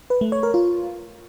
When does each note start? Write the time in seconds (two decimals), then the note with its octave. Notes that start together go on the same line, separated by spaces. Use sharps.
0.10 B4
0.21 A3
0.32 C#5
0.43 A#4
0.54 F4